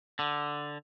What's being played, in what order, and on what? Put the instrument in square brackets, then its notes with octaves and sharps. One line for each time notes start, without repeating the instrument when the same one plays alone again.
[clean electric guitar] D3